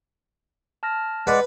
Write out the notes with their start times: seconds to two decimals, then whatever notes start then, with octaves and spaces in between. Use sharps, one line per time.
0.83 A5 F6 A#6
1.27 G#3 B4 D5 F#5